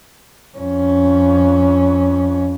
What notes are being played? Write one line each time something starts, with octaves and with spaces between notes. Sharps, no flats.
F2 C#4